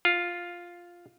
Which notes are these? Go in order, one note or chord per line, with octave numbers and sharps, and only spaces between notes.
F4